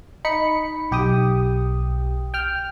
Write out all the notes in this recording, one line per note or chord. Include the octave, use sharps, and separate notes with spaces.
D#4 B5 C#7
B1 G4 G5 D#6
G5 F6